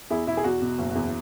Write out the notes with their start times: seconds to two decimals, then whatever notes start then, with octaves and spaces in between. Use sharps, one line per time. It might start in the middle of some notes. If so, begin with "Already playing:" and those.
0.10 E2 E4 G#4
0.27 B2 E4
0.37 G#4
0.44 E2 F#4
0.62 B2
0.79 F#1
0.95 E2